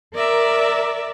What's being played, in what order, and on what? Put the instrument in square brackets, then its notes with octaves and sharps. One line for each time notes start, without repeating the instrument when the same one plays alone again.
[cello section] A#4 [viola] D5 E5